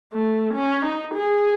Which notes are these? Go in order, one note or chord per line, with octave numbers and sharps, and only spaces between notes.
A3
C#4
D#4
G#4